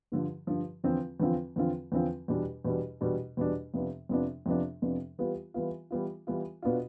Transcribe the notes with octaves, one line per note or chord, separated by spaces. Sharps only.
G2 D3 F3
G2 D3 F3
E2 D3 F3 C4 F4
E2 D3 F3 C4 F4
E2 D3 F3 C4 F4
E2 D3 F3 C4 F4
E2 B2 G3 D4
E2 B2 G3 D4
E2 B2 G3 D4
E2 B2 G3 D4
F2 C3 F3 B3 D4
F2 C3 F3 B3 D4
F2 C3 F3 B3 D4
F2 C3 F3 B3 D4
E3 G3 B3 F4
E3 G3 B3 F4
E3 G3 B3 F4
E3 G3 B3 F4
B2 B3 D4 F4